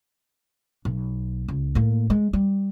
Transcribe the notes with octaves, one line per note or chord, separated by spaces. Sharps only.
B1
C#2
A2 A#3
G#3
G3